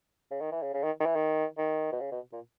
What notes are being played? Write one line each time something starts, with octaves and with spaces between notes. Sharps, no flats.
C#3
D#3
E3
C#3
C#3
D#3
D#3
E3
D#3
D#3
B2
C#3
B2
A#2